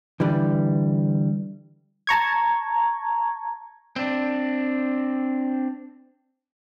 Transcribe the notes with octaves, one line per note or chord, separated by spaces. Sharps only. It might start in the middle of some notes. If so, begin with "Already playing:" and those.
D3 E3 G3
A5 A#5 C#6 G#6
C4 D4